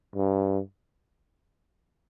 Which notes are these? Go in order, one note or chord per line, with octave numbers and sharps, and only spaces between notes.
G2